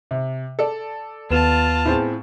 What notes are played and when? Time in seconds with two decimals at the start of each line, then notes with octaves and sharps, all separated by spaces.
0.11 C3
0.59 A4 D5
1.31 D#2 B3 F4 A5 E7
1.85 A2 C4 G#4